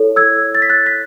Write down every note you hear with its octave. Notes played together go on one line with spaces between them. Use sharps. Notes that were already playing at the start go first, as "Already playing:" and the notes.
Already playing: E4 A4 C#5
E6 G#6
A6
B6
F#6 A6
B6